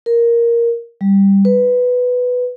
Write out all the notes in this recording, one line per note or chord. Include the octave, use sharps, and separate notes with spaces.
A#4
G3
B4